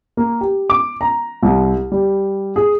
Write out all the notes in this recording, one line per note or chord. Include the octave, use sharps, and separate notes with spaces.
A#3
G4
D6
A#5
C2
G3
G#4